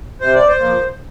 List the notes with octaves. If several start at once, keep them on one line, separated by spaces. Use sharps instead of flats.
C3 C5
D5
C5
F3 A#3